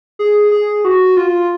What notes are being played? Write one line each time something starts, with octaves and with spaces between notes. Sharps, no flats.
G#4
G#4
F#4
F4